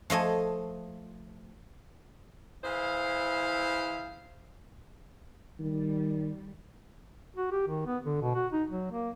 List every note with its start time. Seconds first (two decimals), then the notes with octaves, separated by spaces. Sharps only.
0.10 F3 A3 D#5 G#5
2.64 E3 E4 G#4 C5 F5
5.60 D#3 G3
7.37 F#4
7.52 G4
7.68 D#3
7.86 B3
8.04 D3
8.21 B2
8.35 F#4
8.53 D#4
8.70 F#3
8.91 A#3